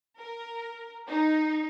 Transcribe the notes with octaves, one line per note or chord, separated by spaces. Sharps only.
A#4
D#4